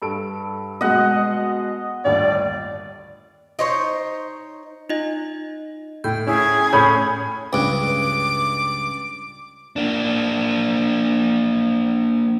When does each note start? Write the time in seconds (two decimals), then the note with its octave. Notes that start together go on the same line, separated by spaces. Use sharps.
0.02 G2 A4 D7
0.81 B2 G#3 D#5 F#5
2.05 G1 D#2 A2 D5
3.59 D#4 C5 C#5
4.90 D#4 F4 D#5
6.04 A2 G5 G6
6.27 C#4 E4 G#4
6.73 A2 C#4 E4 C#5 B5 G6
7.53 C#2 G2 D6
9.76 A#3 D4